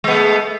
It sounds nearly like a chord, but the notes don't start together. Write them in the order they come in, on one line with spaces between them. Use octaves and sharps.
G#3 B3 A3